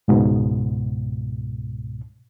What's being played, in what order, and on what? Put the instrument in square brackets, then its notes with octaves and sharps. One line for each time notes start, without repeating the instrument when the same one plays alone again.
[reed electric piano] C#2 G#2 B2